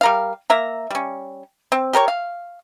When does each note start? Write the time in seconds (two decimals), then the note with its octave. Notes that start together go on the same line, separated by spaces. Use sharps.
0.01 G3 A#4 F5
0.50 A#3 E5 A#5
0.91 G3 C#4
1.72 C4
1.93 G4 A#4 C5 C#5
2.08 F5